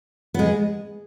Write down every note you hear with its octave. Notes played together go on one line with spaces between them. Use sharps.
B3
G#3